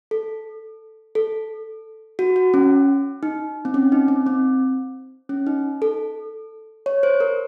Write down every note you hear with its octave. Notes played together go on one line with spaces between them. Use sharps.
A4
A4
F#4
F#4
C#4
D#4
C4
C#4
D#4
C4
C4
C#4
D#4
A4
C#5
C5
A#4